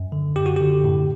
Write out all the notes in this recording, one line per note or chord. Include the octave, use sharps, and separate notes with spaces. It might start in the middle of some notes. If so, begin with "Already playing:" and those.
Already playing: F#2
D3
F#2 G4
F#4
D3 G4
A2